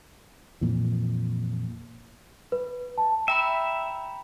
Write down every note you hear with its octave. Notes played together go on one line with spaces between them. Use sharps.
F2 A#2 E3
B4
A5
E5 G5 A#5 B5